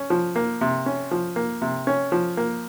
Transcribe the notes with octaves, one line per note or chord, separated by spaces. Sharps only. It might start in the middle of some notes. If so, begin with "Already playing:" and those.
Already playing: C#4
F3
A#3
C3
C#4
F3
A#3
C3
C#4
F3
A#3